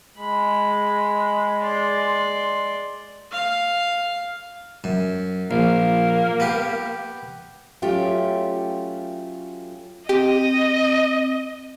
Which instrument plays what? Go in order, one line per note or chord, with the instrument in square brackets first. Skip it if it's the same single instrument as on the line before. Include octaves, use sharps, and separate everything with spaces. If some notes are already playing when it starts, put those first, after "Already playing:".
[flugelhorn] G#3 [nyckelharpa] B5
[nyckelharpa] D5 C6
F5
[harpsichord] F#2
[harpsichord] A#1 [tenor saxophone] A#3
[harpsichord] B3 G4
[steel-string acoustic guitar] F#3 A3 C#4 F4 G4
[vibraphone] C4 [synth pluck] G4 [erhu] D#5